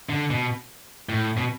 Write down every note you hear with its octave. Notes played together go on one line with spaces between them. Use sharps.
D3
B2
A2
B2